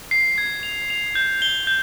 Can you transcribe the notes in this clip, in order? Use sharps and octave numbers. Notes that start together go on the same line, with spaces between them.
C7
G#6
F7
F7
G6
G7
G6